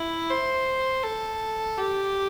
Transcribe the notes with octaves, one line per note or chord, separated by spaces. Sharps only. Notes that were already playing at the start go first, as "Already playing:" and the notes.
Already playing: E4
C5
A4
G4